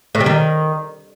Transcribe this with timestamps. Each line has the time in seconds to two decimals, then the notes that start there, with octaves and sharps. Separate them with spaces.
0.15 A2
0.20 G3
0.26 D#3